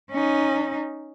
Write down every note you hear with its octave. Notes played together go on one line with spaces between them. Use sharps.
C#4 D#4